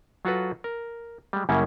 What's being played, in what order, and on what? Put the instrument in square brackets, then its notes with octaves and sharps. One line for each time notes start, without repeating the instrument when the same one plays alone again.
[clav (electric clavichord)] F#3 F4 F#4 A4 B4
A#4
G3 G#3
F#2 C#3 G3 A#3 C#4 E4